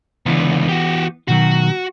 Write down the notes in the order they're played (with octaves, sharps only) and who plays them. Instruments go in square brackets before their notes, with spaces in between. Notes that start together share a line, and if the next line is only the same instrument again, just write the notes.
[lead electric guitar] C#2 D3 [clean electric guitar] E3 B3
[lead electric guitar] F#4 G4
[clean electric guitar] B2 D#3 F#3 [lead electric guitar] F#4